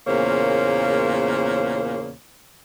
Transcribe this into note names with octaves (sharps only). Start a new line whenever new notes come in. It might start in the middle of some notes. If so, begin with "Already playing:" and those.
E2 A#2 C#3 A#3 C5 C#5